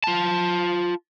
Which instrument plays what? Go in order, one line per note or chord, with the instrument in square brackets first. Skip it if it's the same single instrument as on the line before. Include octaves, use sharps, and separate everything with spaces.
[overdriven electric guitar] F4 A5